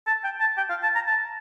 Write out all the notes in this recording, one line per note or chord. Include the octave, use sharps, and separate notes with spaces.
A5
G5
A5
G5
F5
A5
A#5
A5